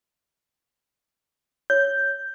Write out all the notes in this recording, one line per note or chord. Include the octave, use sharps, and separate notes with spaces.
C#5 G6